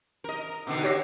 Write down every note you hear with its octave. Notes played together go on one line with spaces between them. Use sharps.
A#4 D#5
B2 D3 D#3
G4 C#5 A#6